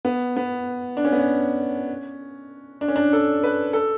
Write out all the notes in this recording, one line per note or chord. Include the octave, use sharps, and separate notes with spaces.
B3
B3
D4
C#4
B3
C#4
D4
C#4
D4
A4
B4
A4